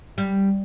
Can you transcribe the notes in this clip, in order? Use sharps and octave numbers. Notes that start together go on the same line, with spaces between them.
G3